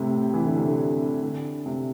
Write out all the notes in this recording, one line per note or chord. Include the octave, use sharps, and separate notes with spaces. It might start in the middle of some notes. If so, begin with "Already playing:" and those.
Already playing: A2 C3
E3
D3
C3
D3
D3
C3